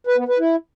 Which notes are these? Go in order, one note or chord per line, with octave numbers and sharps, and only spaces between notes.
B4
B3
B4
E4